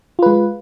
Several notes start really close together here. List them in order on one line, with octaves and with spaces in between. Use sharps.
F4 B4 G#3